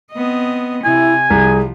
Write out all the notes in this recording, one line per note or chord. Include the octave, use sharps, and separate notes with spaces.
B3 C4 D#5
C3 E4 G#5
C2 F3 G#4